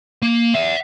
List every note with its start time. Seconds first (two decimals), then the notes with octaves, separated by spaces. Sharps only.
0.22 A#3
0.54 E5 F#5